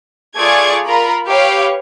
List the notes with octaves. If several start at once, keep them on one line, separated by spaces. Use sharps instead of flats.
A3 F4 G#4 D5 C#6 G#6
F4 A#4 A#5 B5
G4 B4 C#5 F5 G5